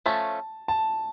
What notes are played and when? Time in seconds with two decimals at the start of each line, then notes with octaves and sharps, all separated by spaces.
0.06 F3 A3 C#4 A5
0.68 A5